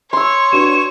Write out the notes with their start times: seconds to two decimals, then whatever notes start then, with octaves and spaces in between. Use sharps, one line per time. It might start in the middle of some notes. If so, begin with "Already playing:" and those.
0.13 C#5 C6 E6
0.52 D4 F#4 B4 E7